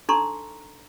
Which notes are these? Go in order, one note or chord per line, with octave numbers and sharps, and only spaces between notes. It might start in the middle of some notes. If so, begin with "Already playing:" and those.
D4 D#4 A4 A#5 C6 C#6